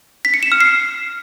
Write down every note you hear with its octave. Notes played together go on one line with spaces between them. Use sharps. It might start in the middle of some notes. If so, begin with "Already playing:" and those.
B6
C#7
E7
F6
C7